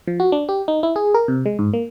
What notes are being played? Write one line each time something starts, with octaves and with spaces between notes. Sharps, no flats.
F3
F#4
D4
G4
D#4
E4
G#4
A#4
C3
G#3
G#2
A#3